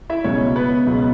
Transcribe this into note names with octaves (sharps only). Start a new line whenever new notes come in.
E4 E5
C#2 B2 F#3 C#4 C#5
B3 B4
C#2 B2 F#3